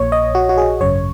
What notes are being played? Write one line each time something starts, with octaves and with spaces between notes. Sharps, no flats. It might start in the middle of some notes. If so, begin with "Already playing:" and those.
Already playing: A#1 A#2 C#5
D#5
F#4
F#4
G#4
G#1 F#2 C#3 C#5